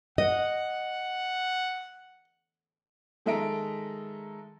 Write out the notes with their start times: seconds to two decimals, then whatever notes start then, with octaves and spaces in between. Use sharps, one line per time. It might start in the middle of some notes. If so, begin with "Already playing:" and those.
0.18 D#5 F#5
3.26 D#3 G#3 A4 E5 A#5 D7